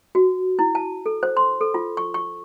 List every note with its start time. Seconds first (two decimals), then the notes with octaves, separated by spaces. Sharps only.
0.15 F#4
0.59 E4
0.75 A5
1.06 A4
1.23 C5
1.37 C6
1.61 A4
1.74 F4
1.97 C#6
2.14 C#6